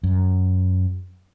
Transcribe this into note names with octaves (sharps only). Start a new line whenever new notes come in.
F#2